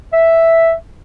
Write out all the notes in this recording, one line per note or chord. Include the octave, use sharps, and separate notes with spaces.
E5